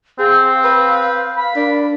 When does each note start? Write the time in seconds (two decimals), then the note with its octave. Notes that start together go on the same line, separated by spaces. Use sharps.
0.19 C4 G#4 F5
0.64 B4
1.37 B5
1.56 D4 A#4